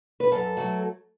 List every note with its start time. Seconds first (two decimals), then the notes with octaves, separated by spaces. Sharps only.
0.20 B4
0.32 F#2 A4
0.57 F#3 A3